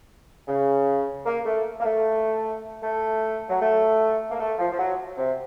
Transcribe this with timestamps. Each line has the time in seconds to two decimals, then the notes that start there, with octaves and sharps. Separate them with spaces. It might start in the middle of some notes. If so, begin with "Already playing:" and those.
0.48 C#3
1.26 A#3
1.45 A3
1.80 A#3
1.85 A3
2.83 A3
3.50 F#3
3.61 A3
4.31 A#3
4.39 A3
4.59 F3
4.71 F3
4.79 F#3
5.18 C3